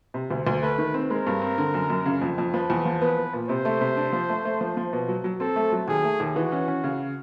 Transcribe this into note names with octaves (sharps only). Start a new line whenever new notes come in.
C3
D2
D2
A3 B4
D#3
C4
G#3 A#4
G2
C4
D3
F#2
F#2
C#3
F2
F2
F3 B4
E2
F3
B3 B4
B3
A#2
C3 C5
A3
C3
D4
F3
A3
A3
F3
F3
B2
F#3
F#3
C4 A4
A3
F#3
D#2 G#4
A3
D#2
E3 F#4
C#4
C#4
C#3